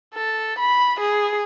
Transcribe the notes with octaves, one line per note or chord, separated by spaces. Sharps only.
A4
B5
G#4